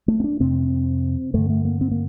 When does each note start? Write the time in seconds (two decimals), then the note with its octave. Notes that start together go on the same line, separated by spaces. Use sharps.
0.08 A3
0.20 C4
0.24 D4
0.40 F2 C3 C4
1.34 G2 D3 A3
1.50 A3
1.65 A#3
1.81 C4
1.91 A#3